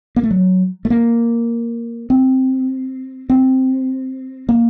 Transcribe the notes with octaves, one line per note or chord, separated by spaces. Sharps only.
A#3
A3
F#3
A3
A#3
C4
C4
A#3